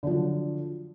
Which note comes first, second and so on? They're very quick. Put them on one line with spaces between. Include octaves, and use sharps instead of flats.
D3 F3 F#3